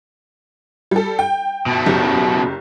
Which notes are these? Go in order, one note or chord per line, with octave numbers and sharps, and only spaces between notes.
G3 A4
G5
B2 A3
F#1 G4